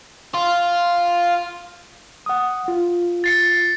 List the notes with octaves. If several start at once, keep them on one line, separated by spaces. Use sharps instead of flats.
F4
F#5 D#6
F4
A6 C7 C#7